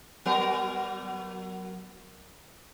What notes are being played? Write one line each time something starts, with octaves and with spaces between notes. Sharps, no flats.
F#3 B3 A#4